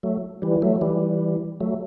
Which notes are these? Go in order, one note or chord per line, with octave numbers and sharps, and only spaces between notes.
F#3 A3
E3 G3
F#3 A3
E3 G3
F#3 A3